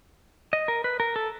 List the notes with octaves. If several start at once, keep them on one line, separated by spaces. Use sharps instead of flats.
D#5
A#4
B4
A#4
A4